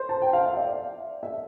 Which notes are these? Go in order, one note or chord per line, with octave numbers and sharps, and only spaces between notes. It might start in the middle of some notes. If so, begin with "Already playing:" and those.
Already playing: C5
A5
G5
F5
E5
D5
E5